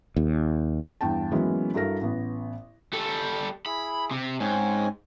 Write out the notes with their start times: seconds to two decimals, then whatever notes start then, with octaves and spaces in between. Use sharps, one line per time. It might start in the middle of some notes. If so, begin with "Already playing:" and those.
0.16 D#2
1.01 E2 G2 G5 A5
1.32 E3 F#3 G#3 A#3 B3 C#4
1.74 G2 E4 F#4 A4 A#4 A#6
2.01 A1 B3
2.93 G3 A4
3.66 E4 G#4 B5
4.11 C3
4.40 G#2 C4 C#4 G#5